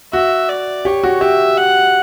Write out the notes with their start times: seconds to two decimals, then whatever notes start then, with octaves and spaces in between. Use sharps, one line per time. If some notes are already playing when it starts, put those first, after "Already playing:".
0.13 F#4 E5
0.49 D5
0.85 G4 C#5
1.03 F#4
1.21 G4 E5
1.57 F#5